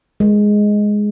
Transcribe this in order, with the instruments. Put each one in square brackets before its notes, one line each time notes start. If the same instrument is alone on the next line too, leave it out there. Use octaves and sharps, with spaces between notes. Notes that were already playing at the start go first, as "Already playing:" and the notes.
[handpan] G#3